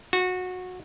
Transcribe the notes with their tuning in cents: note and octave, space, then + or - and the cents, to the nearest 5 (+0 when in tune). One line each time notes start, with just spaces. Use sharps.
F#4 -20